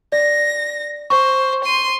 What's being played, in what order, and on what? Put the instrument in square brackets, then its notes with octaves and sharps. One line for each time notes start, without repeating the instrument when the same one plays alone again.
[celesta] D5 [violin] A#6
[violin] C5 [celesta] C#6
[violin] C6 D#7